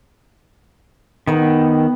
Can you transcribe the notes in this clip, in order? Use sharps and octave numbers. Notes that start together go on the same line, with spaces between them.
D#3 B3 B4